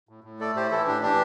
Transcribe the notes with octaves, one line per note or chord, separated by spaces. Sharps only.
A2
A2
A3 A4 D5
A2 G4 C5
E3 E4 A4
A2 D4 G4
E3 D4 G4